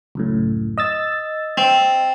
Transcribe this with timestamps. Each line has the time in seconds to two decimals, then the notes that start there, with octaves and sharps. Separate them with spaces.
0.15 C#2 F#2 A2
0.78 D#5 E6 A6
1.58 C4